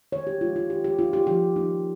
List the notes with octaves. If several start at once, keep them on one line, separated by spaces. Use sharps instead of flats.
D#3 C#5
G4
G#3 D#4 F4
F4
D#3 G4
G4
A#3 D#4 F4
G4
F3 G4
A#3 D#4